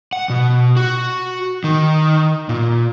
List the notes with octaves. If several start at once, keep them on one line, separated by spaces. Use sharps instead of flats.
F#5
B2
F#4
D#3
A#2